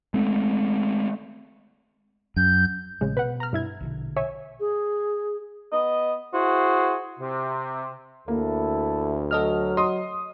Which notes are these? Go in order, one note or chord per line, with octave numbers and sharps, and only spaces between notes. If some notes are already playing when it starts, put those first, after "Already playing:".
G#3 A3 C4
F#2 G6
A1 C#3 G#3
B2 B4 F#5
A#5 F6
G2 E4 G#6
A#1 B2 D3
C#5 E5 G#5
G#4
B3 D#5
E4 F#4 G#4 C5
C3
D2 A#3 E4 A4
F#3 A4 D#5 F6
D#5 C6 D#6